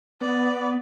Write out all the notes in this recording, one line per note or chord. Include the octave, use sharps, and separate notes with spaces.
B3 D5